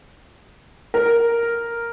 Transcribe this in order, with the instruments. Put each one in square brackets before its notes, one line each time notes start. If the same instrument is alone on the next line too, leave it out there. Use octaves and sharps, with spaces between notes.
[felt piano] A#4